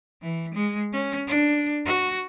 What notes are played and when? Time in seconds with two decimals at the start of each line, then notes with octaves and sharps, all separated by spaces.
0.23 E3
0.54 G#3
0.93 C#4
1.28 D4
1.86 F#4